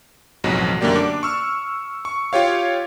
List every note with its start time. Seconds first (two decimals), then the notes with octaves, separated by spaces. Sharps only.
0.44 A1 F2 G#2 B2 F#3
0.81 F#2 D3 A3 A#3 G4 D5
0.95 D4 D6
1.23 C#6 E6 F6
2.05 C#6
2.33 F4 G4 C#5 F5